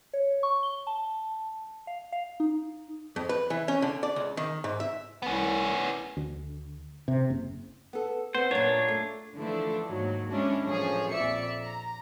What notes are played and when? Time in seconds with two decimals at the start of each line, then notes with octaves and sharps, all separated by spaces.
0.14 C#5
0.43 C#6
0.63 G7
0.87 A5
1.87 F5
2.12 F5
2.40 D#4
3.16 F2
3.29 B4
3.50 E3
3.68 C#4
3.82 D3
4.03 D5
4.16 C#2
4.37 D#3
4.64 G#2
4.80 E5
5.22 C2 B3 C#4
6.17 D2
7.08 C3
7.30 F#1
7.93 B3 A4
8.35 B3 C4 C5
8.51 F#2 A#2 D4 F4 C#5
8.88 A3
9.35 D3 E3 F3 A3 D4
9.88 D#2 G#2 F#3
10.29 G#3 C#4 D4 E4
10.66 A1 F#2 F3 G#4 C#5
11.11 A#1 F2 D5 E5 C#7
11.64 A#5